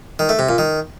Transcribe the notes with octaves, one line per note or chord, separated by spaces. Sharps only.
D#3
A3
C3
A#2
D#3